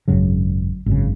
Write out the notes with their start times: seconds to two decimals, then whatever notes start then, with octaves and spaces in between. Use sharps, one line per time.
0.08 G#1 F#2 C#3 F#3
0.86 G#1 F#2 C#3